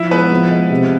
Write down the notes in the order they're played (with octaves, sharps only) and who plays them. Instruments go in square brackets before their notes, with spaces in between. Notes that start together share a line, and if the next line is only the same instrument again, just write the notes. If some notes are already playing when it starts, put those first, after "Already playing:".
Already playing: [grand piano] F3 [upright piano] E4 E5
[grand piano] G#3 [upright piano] B3 B4
[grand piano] F3
G#3
C3